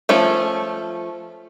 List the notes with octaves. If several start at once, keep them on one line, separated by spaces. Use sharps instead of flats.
F3 A3 C#4 F4